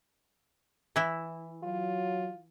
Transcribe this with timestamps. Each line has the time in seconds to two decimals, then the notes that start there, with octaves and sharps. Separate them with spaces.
0.96 E3 E4
1.63 F#3 F4